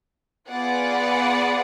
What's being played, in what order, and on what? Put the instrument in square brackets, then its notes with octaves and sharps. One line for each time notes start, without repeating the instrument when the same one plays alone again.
[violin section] B3 F4 G#4 D5 F#5